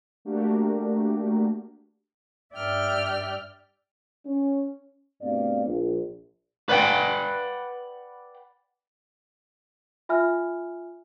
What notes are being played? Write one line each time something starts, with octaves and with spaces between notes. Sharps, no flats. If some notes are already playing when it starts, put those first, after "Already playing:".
A3 A#3 D4 F#4 G4 A#4
G2 D5 E5 G5 F6
C#4
G2 B2 A3 C4 D5 F5
A#1
B4 D5 F#5 G5
F4 E5 G#5 F6